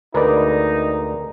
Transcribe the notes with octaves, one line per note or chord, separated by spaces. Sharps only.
D2 G#3 D#4 A#4 B4 D5 A#5